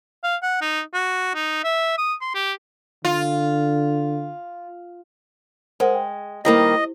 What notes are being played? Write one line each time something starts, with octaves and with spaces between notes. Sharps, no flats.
F5
F#5
D#4
F#4
D#4
E5
D#6
C6
G4
D3 F4
G#3 A#4 C5 F#5
G5
D#3 G3 A#3 E4 G4 C5 D#5